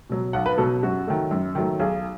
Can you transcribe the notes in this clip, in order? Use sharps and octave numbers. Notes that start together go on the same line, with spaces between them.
B2 F#3
B1 F#5
B4
B2 F#3 A4
F#2 F#4
D#3 F#3 A3
F#2
D#3 F#3 A3
B1 G#4